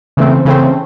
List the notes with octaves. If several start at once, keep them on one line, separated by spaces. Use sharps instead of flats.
C#3 E3 A3 C4
C#3 E3 A3 C4